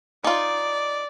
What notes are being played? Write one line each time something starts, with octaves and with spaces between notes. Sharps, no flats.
D#4 F4 D5